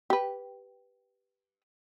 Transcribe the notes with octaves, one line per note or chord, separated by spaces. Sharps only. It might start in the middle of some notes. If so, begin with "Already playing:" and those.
G4 B4